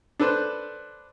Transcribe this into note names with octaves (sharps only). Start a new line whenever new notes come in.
D4 A4 B4 C5